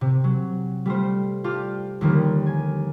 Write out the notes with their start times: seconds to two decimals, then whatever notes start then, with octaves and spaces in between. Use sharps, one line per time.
0.01 C3
0.24 F#3
0.86 G3 A3 F4 C5
1.44 F4 G4 D5 A5
2.01 D#2 D3 F3 G3 A#3
2.46 G#5